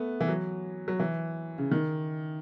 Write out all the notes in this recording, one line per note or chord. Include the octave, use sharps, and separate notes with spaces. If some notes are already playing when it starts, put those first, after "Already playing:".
Already playing: A3 B3
E3
F#3
F#3
E3
C#3
D#3